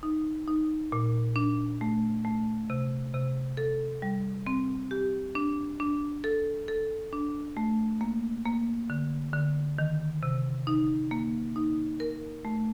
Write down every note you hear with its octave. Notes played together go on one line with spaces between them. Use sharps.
D#4
D#4
A#2
D4
A3
A3
C3
C3
A4
G3
C4
G4
D4
D4
A4
A4
D4
A3
A#3
A#3
D3
D3
D#3
C3
D#4
A#3
D#4
A#4
A3